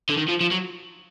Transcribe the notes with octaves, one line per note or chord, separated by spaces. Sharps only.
D3
D#3
F3
F3
F#3